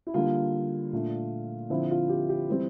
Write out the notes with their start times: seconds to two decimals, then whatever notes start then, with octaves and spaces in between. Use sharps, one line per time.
0.07 E4
0.14 D3 G3 A#3 F4
0.93 A#2 A3 D4
1.70 D3 F3 C4 E4
1.90 F4
2.09 G4
2.29 G4
2.49 E3 G3 C4